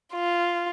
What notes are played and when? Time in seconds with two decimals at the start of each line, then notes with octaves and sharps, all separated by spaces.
0.14 F4